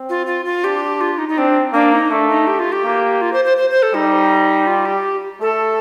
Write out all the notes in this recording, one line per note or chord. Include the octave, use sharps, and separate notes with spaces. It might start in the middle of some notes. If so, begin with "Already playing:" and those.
Already playing: C4
F4
F4
F4
D4 G4
F4
D#4
D#4
C4 D4
A#3 D4
D#4
A3 D4
D#4
G4
F4
G4
A#3
F4
C5
C5
C5
C5
A4
G3 D#4
F4
G4
A3 A4